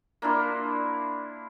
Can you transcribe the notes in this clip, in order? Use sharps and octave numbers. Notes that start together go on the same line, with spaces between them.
A#3 D4 E4 F4